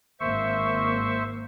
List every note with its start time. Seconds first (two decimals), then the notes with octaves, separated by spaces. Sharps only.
0.20 G#1 A#3 C5 E5 C#6